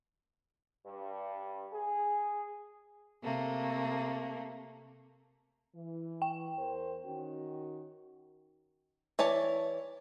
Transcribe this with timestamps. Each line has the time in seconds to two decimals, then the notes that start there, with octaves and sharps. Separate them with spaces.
0.85 G2
1.73 G#4
3.22 C3 A3 A#3
5.75 E3
6.22 G5
6.57 E2 A#4 C5
7.05 D#3 C#4 F#4
9.19 E3 C#5 D5 A5